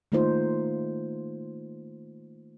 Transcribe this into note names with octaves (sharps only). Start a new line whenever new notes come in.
D#3 A3 A#3 D#4 F4 C5